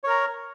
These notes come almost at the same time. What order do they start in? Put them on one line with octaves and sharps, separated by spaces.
C#5 A#4 A#5